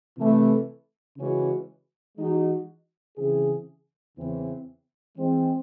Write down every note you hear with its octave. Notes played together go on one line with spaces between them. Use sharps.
C3 E3 A3
C#3 E3 G#3 C#4 F#4
E3 G#3 D#4 F#4
C#3 E3 C4 E4 G#4
E2 C#3 E3 C4
E3 G#3 C4